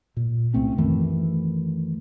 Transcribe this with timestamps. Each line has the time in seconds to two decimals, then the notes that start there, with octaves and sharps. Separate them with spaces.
0.17 A#2
0.54 C2 A3 C4 C#4
0.78 F#2 D#3 E3 A3